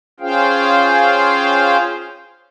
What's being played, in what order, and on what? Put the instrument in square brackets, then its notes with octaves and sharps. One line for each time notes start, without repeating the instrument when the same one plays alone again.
[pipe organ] C#4 F4 G#4 C5 F5 G5